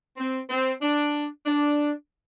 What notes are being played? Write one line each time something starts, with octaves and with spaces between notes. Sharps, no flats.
C4
C4
D4
D4